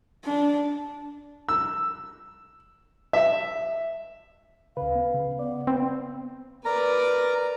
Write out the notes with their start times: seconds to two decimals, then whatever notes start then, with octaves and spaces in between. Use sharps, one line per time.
0.25 D4
1.49 E6
3.13 E5
4.77 D2 C#3 B4 F5
4.95 B3
5.14 C#3
5.39 B3 D5
5.67 B3 C4 B4
6.65 A#4 B4 D5 A#5